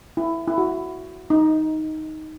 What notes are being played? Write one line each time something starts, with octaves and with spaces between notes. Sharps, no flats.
E4
E4
F#4
D#4